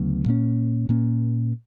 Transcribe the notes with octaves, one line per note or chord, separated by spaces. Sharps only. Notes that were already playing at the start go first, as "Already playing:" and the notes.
Already playing: D2 C#3 F#3 B3
A#2 A#3 C#4
A#2 A#3 C#4